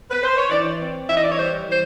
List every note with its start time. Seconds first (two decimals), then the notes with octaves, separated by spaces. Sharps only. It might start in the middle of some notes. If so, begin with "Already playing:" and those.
0.10 B4
0.23 C5
0.36 C#5
0.49 E3 D5
0.79 C4
1.07 E3 E5
1.15 D#5
1.22 D5
1.30 C#5
1.38 G3 C5
1.68 E3 C5